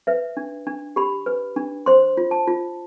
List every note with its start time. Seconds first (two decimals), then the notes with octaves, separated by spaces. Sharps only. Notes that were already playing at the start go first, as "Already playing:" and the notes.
0.07 B4 E5
0.37 D4
0.67 D4
0.96 G4 B5
1.26 B4
1.56 D4
1.86 C5 C6
2.17 F4
2.31 A5
2.47 F4